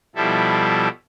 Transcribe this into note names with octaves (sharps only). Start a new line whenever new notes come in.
B2 F3 G3 E4 A4